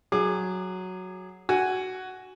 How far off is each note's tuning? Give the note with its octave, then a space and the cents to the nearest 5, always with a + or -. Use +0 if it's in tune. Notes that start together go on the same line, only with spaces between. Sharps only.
F#3 +0 G#4 +0 D6 +35
F#4 +10 G#5 +0